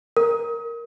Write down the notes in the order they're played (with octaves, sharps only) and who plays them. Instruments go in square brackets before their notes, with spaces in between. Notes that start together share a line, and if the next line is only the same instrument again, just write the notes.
[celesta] A#4